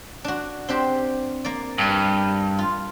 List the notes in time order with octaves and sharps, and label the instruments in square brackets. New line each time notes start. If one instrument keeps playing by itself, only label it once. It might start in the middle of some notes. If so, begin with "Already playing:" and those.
[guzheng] D4 F#4
C4 D4 G4
A#3 D5
[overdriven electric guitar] G2
[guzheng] F4